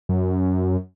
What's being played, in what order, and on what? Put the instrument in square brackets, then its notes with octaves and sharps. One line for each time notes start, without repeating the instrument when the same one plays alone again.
[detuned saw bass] F#2